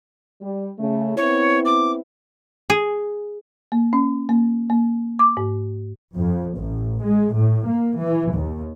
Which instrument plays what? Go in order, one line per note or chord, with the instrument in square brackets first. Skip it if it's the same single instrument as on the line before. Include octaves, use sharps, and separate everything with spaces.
[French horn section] G3
C#3 A3
[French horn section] B3 C4 E4 [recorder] C#5
[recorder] D6
[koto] G#4
[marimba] A#3
C#4
A#3
A#3
D6
G#2
[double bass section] F2
A1
G#3
A2
A#3
E3
D#2